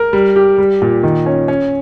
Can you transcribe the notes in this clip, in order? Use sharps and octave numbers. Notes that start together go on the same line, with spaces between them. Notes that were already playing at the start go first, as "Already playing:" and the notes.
Already playing: A#4
G3
G4
G3
A#2
D#3
C#4
C#4